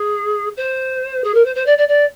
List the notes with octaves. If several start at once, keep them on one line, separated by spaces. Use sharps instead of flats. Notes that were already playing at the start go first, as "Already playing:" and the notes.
Already playing: G#4
C5
G#4
A#4
C5
C5
D5
D5
D5